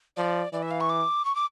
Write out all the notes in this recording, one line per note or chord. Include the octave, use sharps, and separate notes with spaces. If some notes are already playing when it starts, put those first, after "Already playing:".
F3 D5
E3 D5
E5
F5
C#6
D6
C#6
D6